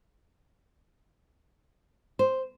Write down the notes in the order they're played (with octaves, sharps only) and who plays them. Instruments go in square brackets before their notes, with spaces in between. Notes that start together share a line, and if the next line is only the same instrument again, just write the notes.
[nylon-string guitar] C5